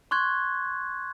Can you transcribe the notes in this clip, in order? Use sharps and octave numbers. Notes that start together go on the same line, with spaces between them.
C6 C#6 F#6 G#6